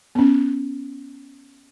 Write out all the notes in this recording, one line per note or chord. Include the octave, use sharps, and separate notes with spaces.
B3 C#4